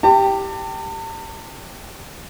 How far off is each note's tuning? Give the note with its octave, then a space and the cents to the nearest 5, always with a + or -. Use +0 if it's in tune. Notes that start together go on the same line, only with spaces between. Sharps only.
G4 +0 A5 +40